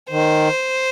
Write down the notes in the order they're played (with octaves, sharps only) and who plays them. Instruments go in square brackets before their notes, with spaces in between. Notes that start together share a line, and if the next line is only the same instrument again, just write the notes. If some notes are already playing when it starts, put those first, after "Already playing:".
[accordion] D#3 [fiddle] C5